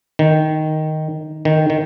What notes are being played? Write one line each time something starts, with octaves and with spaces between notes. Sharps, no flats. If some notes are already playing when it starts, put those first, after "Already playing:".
D#3
D#3
D#3